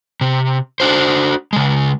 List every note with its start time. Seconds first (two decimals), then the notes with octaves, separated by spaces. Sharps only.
0.21 C3
0.80 D4 F#4 C5
1.53 C#3 G#3